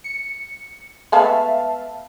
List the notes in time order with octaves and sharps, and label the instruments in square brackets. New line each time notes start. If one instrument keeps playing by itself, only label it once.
[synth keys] C#7
[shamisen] G#3 A3 B3 [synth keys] E5 F5 A5